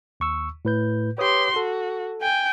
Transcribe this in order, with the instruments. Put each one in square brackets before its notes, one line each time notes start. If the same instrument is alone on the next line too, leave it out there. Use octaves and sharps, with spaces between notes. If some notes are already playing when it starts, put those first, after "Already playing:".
[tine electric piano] D#2 C#6 E6
A2 B4 G6
[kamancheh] G4 C6 [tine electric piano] B4 C#5 D#6
[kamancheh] F#4 [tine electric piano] A4
[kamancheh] G5 G#5